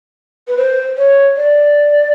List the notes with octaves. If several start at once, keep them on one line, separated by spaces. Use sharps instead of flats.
B4
C5
C#5
D5